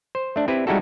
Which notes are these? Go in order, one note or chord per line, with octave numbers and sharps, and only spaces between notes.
C5
A3 D4
C4 E4 G4 B4
G3 G#3 D#4 E4 F#4 A4